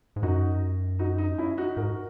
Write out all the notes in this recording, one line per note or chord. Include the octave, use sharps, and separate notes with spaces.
G#2
F#2 D#4 F#4
D#4 F#4
D#4
C#4 E4
D#4 F#4
G#2 F#4 A#4